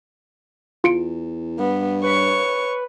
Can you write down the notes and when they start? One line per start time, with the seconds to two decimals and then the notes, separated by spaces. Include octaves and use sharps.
0.84 E2 F4 C#7 D7
1.59 G2 B3
2.03 B4 C#5 C#6